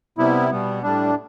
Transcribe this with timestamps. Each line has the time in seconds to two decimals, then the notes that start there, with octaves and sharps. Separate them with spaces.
0.18 C3 G3 B3 E4
0.50 B2 G3 B3
0.83 A2 G3 D4